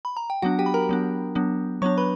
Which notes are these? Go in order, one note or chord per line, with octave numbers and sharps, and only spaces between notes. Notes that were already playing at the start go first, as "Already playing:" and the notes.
B5
A#5
G5
F#3 B3 D4 F#4 F#5
G4 G5
B5
A#4 A#5
F#3 B3 D4
F#3 B3 D4
F#3 B3 D4 C#5 C#6
B4 B5